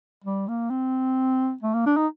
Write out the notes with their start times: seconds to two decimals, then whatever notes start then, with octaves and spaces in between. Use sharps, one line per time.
0.24 G3
0.48 A#3
0.70 C4
1.63 A3
1.74 A#3
1.86 D4
1.97 D#4